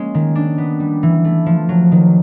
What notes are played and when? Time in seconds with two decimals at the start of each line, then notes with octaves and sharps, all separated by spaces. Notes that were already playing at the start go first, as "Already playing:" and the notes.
Already playing: G#3 A#3 C#4
0.14 D#3
0.35 D4
0.58 B3
0.80 G3
1.03 E3
1.25 A3
1.46 F3
1.69 F#3
1.92 D#3